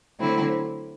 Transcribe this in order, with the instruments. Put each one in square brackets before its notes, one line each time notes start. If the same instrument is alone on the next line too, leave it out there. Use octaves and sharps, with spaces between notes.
[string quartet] D3 F#3 A3 C4 E4